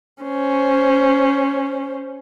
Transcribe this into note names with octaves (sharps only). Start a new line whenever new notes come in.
C#4 C5